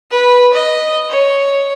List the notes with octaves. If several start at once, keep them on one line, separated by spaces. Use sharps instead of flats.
B4
D#5
C#5